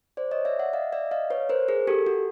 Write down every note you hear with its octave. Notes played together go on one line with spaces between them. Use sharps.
C5 D5
C#5 D#5
D5 E5
E5 F#5
D#5 F5
D5 E5
D#5 F5
B4 C#5
A#4 C5
G#4 A#4
G4 A4
F#4